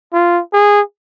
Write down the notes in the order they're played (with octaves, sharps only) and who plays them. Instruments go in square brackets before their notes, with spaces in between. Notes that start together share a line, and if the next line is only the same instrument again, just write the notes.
[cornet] F4
G#4